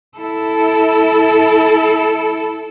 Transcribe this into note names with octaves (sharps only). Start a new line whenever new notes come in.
E4 A4